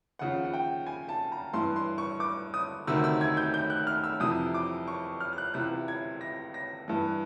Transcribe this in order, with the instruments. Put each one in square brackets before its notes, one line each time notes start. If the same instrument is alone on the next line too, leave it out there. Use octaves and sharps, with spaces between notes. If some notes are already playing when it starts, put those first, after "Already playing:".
[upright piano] D#2 C#3 F3 F#5
F#5
G5
G#5
A5
A#5
G2 E3 C6
C6
C#6
D6
D#6
D2 C3 D#3 E6
E6
G#6
G6
G6
F#6
F6
E6
F2 C3 E3 D#6
D6
C#6
F6
F6
F#6
C#2 C3 E3 F#6
G#6
A#6
A#6
G2 E3